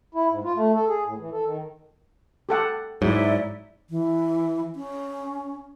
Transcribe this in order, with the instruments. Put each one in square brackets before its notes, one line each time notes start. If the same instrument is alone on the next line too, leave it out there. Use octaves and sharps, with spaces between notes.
[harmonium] E4
G#2
F4
A3
A4
G#4
A2
E3
A4
D#3
[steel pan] G4 A4 F#5
[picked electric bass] G#2 [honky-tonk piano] F#3 [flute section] E4 D5 E5
[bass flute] E3
C#4